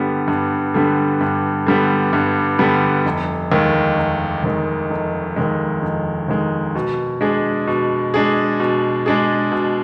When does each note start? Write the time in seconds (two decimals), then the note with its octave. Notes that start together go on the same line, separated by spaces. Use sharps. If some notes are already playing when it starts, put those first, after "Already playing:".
Already playing: G2 D3 G3 B3
0.28 G2
0.74 D3 G3 B3
1.21 G2
1.66 D3 G3 B3
2.13 G2
2.59 D3 G3 B3
3.06 F1
3.52 D#2 D#3 G#3
3.98 F1
4.44 D#2 D#3 G#3
4.90 F1
5.36 D#2 D#3 G#3
5.82 F1
6.28 D#2 D#3 G#3
6.75 B2
7.21 G#3 D4 G#4
7.67 B2
8.14 G#3 D4 G#4
8.60 B2
9.06 G#3 D4 G#4
9.52 B2